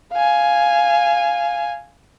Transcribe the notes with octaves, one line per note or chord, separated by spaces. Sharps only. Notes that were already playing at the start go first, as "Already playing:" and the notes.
F5 G#5